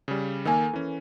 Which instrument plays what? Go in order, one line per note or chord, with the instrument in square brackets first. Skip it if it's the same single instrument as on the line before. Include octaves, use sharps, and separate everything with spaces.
[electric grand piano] C#3 G3
[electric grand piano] D#3 A#3 [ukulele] A4 A#4 G#5
[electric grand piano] E3 C#4